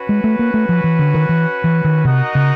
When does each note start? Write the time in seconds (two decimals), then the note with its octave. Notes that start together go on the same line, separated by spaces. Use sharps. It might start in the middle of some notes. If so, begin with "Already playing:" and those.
Already playing: C#4 F#4 B4
0.09 G#3
0.24 A3
0.39 A#3
0.54 A3
0.69 F3
0.84 E3
0.99 D3
1.14 D#3
1.29 E3
1.64 E3
1.85 D#3
2.04 C3 D#4 F#4 A#4 D#5 F#5
2.35 C#3